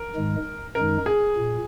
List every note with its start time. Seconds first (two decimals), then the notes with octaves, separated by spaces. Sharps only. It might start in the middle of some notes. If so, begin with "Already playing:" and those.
Already playing: A#4
0.15 G#2 D#3 G#3
0.75 F#2 D#3 G#3 D#4 A#4
1.06 G#4
1.36 A#2